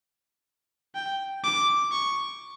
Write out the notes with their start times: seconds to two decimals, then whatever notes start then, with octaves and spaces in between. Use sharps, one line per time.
0.95 G5
1.44 D6
1.92 C#6